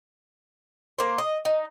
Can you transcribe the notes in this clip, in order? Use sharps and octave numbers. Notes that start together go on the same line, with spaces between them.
A#3 C5
D#5
D#4